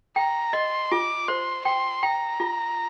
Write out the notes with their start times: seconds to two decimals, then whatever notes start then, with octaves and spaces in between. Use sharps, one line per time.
0.16 G5 A#5
0.53 D#5 C6
0.91 F4 D6
1.28 C5 C6
1.65 G5 C6
2.03 G5 A#5
2.40 F4